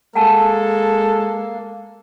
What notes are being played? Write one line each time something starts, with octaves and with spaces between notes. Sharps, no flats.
G#3 A#3 A4 F#5 G#5 A5